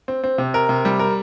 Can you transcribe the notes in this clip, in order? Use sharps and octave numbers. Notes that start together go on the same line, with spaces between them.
C4
C4
C3
A#4
C3
G3
A#4